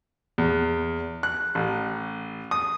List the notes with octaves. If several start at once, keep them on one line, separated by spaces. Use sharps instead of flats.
E2
F#6
A1
D#6